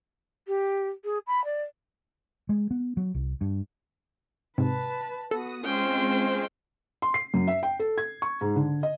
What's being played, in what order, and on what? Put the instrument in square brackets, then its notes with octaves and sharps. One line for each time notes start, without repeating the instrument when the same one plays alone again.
[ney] G4
G#4
B5
D5
[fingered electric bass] G#3
B3
F#3
C2
G2
[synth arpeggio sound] G#2 C3 [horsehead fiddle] B4 A5
[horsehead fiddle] B3 F#4 [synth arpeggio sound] A4 [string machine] D#6
[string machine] G#3 C4 [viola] C#4 G5 [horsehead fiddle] F4 C5
[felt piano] C6
C7
F#2
E5
G5
A4
G#6
C#6
G#2
D3
D#5